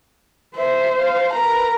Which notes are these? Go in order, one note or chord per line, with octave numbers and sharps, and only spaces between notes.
C5 E5
F5
A#4 B4 A#5